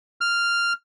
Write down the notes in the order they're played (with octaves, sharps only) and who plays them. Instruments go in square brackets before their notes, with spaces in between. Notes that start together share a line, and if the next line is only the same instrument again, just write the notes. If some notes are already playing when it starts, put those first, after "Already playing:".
[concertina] F6